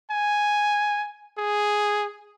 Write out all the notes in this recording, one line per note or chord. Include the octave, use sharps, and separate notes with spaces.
G#5
G#4